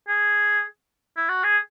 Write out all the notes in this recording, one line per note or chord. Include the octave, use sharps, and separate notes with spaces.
G#4
E4
F#4
G#4